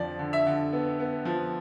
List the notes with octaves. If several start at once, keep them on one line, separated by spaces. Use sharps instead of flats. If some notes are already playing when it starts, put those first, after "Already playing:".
Already playing: F2 D3 F3 D5
D3
E5
D3
B3
B3
F3